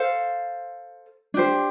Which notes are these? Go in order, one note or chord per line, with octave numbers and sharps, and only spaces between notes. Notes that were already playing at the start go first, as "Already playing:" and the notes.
Already playing: A4 C5 F5
D4 G4 C5